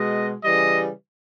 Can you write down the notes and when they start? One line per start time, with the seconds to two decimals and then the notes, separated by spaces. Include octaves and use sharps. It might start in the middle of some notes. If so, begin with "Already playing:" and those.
Already playing: B2 G#3 D#5
0.44 C#3 E3 G3 D#5